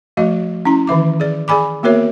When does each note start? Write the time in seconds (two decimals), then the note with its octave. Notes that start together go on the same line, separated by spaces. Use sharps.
0.17 F3 A3 F#4 D#5
0.65 C#4 E4 A#5
0.87 D#3 E3 E5 D6
1.20 G#4 D5
1.48 G#4 D5 G#5 B5 D6
1.83 A#3 B3 F#4 A#4 C#5 E5